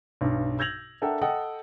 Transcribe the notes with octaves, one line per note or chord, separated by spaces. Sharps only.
B1 G2
E6 G6 G#6 A#6 F7 F#7
D4 A4 A#4 E5 F#5 G5
A4 D#5 F#5 G5 D#6